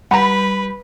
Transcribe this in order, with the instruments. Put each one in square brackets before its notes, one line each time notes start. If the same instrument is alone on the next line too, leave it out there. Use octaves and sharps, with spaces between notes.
[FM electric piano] G3 [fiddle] B4 [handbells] F#5 A#5 [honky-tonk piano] B5